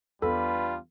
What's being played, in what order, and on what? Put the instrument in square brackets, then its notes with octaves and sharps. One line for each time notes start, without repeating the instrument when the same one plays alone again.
[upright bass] E2 B3 [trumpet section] G3 D4 F4 [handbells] A4 [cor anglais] B4